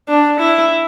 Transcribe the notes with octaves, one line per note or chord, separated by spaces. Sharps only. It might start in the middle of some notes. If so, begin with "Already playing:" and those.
D4
E4